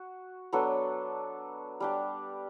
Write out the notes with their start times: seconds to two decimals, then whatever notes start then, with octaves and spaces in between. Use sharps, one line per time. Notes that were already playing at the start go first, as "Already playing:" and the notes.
Already playing: F#4
0.52 F#3 B3 D4 A4
1.80 G3 D4 G4